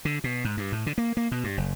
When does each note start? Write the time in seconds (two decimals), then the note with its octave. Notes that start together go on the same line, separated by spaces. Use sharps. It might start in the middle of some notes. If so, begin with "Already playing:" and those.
0.05 D3
0.24 B2
0.45 G#2
0.57 G2
0.72 A2
0.86 D3
0.98 A#3
1.17 A#3
1.32 B2
1.44 G2
1.57 F#1